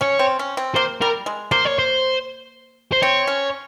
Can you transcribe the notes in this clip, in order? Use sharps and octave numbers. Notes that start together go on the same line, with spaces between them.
C#4 C#5
C4
C#4
C4
A#3 C5
G3 A#4
G#3
A#3 C5
C#5
C5
C5
C4 C#5
C#4